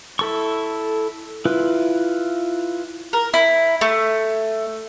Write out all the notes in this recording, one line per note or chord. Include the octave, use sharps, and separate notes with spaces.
E4 A4 C#6
E4 F4 B4
A#4
E4
A3